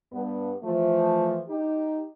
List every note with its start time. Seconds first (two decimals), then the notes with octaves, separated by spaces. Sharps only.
0.12 G2 B3
0.64 E3 F3 A3
1.49 D#4 G4